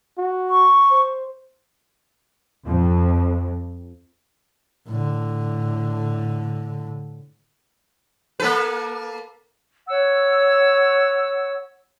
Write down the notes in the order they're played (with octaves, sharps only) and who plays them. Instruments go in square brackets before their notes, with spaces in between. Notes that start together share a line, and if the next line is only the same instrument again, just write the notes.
[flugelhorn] F#4
[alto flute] C#6
[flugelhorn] C5
[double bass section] F2
[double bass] A2 D3
[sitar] A#3 A4 B4
[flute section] C#5 F#5 E6